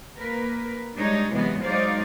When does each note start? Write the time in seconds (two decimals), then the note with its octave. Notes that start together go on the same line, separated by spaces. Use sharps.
0.19 A#3 A#4 B4
0.97 G3 G#3 D4 D#4 C#5
1.33 C3 E3 F#3 G#3 B3
1.62 F#3 G#3 D#4 C5 D5 F5